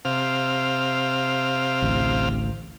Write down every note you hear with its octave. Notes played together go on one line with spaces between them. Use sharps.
C3 F5
A1 D2